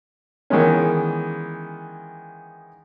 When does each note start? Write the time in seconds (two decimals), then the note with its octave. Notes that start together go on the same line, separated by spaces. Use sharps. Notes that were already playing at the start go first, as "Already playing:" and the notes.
0.50 D#3 E3 G#3 B3 C#4